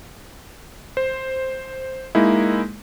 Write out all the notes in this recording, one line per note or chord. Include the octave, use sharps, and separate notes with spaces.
C5
G#3 A#3 D#4 E4